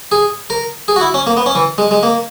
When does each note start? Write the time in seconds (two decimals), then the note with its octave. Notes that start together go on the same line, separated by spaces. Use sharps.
0.12 G#4
0.50 A#4
0.88 G#4
0.96 F#4
1.01 E4
1.14 C#4
1.27 A#3
1.37 B3
1.46 C#4
1.55 E3
1.78 G#3
1.91 G#3
2.03 A#3